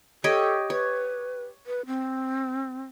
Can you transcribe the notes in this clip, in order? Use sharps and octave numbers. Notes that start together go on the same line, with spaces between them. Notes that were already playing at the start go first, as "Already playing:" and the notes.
G4 A4 C#5 D#5
B4 C#5
B4
C4